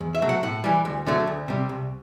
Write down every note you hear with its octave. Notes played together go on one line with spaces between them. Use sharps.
E2
E5
B2 F#3 A3
F#5
A2 F#5
E3 G3
D2
D3 F#3 A3
D2
C3 G3
C2